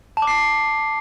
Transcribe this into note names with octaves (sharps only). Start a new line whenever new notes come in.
A5
D6
C7